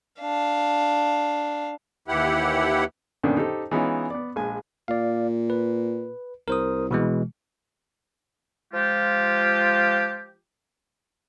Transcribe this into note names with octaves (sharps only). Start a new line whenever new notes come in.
D4 F5
D#2 E3 E4 G4 F#5
F#2 A#2 D3 D#3 B3 D4
D#4 G4 A4 C5
E3 G#3 B3 C#4 D#4 F4
B3 D5
A#1 G#3 G#5
A#2 D5 F5
B4
C2 A#4 C5 D#6
B2 E3 G#3
F3 G#3 F4 G4